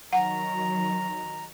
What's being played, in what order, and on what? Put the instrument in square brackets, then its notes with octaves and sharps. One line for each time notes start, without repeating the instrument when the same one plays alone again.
[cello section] D#3 F#3 [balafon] F#5 [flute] A#5